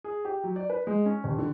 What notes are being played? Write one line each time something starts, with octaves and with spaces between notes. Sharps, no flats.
G#4
G4
F#3
D5
B4
G#3
C#4
D#1
D3